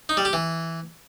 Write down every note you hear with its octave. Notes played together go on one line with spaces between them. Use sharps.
D#4
G3
G4
E3